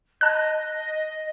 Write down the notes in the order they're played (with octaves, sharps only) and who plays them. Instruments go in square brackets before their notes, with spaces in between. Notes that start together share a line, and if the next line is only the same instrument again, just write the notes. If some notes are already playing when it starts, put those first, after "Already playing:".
[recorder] D#5 [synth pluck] A5 F#6